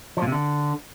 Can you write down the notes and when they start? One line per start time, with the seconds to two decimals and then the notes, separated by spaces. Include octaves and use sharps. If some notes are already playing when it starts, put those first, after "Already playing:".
0.17 F3
0.22 A#2
0.27 C3
0.32 D3